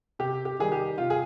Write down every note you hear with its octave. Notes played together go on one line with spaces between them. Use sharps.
C3 G4
G4
D#3 G3 G#4
G4
C3 F4
G#4